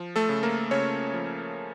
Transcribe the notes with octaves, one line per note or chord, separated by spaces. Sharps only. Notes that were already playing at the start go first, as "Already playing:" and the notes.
Already playing: F3
A3 A4
C#3
A#3 A#4
C#3 C#4 C#5
F3